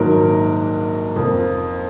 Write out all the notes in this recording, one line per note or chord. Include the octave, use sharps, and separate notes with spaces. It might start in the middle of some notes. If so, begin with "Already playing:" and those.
Already playing: A#1 G#2 D#3 F#3 A#4
F2 F3 A#3